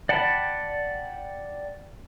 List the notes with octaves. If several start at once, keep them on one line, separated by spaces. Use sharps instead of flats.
D5 F#5 G5 A5 B5